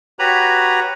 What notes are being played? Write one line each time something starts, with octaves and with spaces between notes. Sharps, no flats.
F#4 G4 B4 C#5 A#5 B5